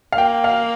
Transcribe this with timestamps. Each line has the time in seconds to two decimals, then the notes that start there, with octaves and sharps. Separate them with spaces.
0.12 F5
0.18 A#3 G5
0.44 F5